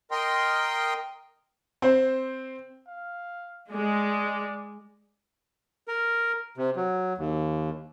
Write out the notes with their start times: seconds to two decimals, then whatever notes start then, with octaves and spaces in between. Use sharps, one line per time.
0.11 A#4 D#5 G5 C6
1.82 C4 C5
2.87 F5
3.72 G#3 D5
5.88 A#4
6.57 C3
6.76 F#3
7.18 D#2